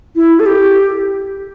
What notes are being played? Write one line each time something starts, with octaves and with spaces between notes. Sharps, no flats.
E4
A4
G4